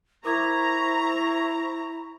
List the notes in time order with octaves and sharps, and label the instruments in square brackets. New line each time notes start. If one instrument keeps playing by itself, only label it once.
[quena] E4 [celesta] A#4 D6 G#6 [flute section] C5 C#6 [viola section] A#5